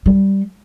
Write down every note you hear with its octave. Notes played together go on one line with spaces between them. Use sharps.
G3